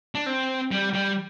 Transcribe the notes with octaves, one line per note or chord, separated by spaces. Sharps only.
D4
C4
G3
G3